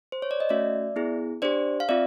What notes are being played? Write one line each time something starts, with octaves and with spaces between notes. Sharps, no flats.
C5
C#5
D5
D#5
A3 C#4 F#4 D5 E5
B3 E4 G#4
D4 G4 C5 D5
F5
C4 F4 D5 E5